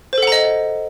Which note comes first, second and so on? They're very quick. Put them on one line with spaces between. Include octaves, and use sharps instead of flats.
C5 A4 F#5 A#5 D#5